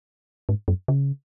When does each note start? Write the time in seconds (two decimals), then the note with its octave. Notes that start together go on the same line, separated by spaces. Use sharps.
0.49 G#2
0.68 F#2
0.88 C#3